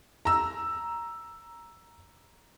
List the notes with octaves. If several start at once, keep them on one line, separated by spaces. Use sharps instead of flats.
A#5 E6